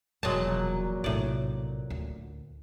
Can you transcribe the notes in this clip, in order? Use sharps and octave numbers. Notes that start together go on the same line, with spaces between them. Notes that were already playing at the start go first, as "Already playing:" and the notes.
E1 A#2 F3 F#3 G#3 A5
A#1 A2 C3 D5
D2